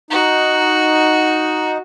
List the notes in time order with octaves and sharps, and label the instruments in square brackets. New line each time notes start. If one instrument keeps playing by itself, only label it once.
[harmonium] D#4 [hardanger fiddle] F#4